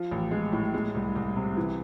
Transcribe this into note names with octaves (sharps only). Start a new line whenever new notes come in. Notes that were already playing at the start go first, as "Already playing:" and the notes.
Already playing: F3
A1
G#3
A2
G#3
C2
C2
C3
E3